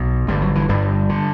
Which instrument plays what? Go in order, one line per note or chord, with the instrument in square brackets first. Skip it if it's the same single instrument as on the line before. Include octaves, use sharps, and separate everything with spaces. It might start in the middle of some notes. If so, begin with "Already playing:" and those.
Already playing: [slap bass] B1 B2
G1 G2 D3 G3
F#3
E3
G1 G2 D3 G3
D3